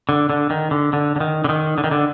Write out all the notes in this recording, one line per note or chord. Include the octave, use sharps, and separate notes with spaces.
D3
D3
D#3
D3
D3
D3
D#3
D3
D#3
D3
D#3
D3